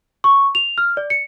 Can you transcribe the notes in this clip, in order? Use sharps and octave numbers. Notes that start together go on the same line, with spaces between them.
C#6
F7
F6
D5
C#7